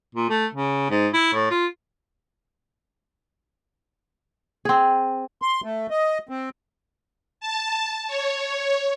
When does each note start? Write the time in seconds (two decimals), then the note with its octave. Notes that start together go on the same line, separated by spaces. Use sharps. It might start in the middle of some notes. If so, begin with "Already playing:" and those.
0.15 A#2
0.30 A3
0.54 C#3
0.90 G#2
1.14 E4
1.33 A2
1.50 F4
4.65 C4 G#4
5.42 C6
5.64 A3
5.90 D#5
6.29 C4
7.40 A5
8.08 C#5